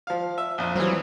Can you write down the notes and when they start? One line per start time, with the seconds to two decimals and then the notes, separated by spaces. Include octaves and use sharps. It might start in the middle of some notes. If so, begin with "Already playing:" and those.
0.07 F3 F5
0.38 E5
0.58 A#1 F2 F4
0.76 E3 F#3 G3 C4